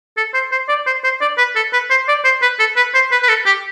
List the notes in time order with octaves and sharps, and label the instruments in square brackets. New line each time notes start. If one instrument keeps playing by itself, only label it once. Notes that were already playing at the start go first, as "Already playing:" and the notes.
[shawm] A4
C5
C5
D5
C5
C5
D5
B4
A4
B4
C5
D5
C5
B4
A4
B4
C5
B4
B4
A4
G4